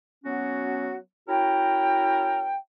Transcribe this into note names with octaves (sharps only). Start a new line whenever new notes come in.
F#3 B3 C#4 F#4
C#4 E4 F#4 A#4 G5